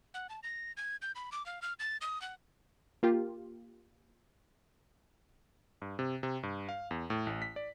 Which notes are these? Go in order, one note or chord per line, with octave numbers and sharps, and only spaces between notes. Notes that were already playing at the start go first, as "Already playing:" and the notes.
F#5
A5
A#6
G#6
G6
B5
D6
F5
F6
A6
D#6
F#5
A#3 F4 G4
G2
C3
C3
G2
F5
E2
A2
A1
B6
D5